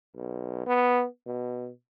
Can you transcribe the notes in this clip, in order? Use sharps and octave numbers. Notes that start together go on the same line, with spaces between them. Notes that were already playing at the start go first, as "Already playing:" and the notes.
B1
B3
B2